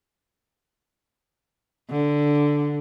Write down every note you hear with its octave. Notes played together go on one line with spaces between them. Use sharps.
D3